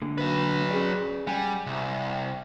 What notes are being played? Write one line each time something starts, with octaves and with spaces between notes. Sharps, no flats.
D3 A#3
F#3 B4
C#4 G#4 D5
G3 F#5 G#5
C2